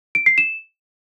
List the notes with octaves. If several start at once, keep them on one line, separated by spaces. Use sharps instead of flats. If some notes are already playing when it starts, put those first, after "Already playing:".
D7
C7
E7